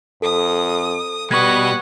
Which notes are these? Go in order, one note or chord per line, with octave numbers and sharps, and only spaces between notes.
F2 A4 D#6
B2 G3 B4 D#5 F#5 C#6 G#6